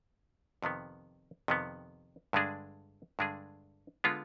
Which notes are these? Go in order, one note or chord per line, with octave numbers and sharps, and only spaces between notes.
F2 C3 D#3 B3
F2 C3 D#3 B3
G2 D3 G#3 D4 G#4
G2 D3 G#3 D4 G#4
D3 G#3 B3 F4